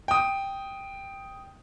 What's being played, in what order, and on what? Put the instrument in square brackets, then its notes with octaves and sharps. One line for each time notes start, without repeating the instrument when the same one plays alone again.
[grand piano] G5 D#6